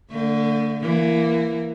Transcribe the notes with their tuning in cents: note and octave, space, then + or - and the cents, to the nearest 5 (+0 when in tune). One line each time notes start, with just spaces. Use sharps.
D3 -10 A3 +40
E3 +20 A#3 +0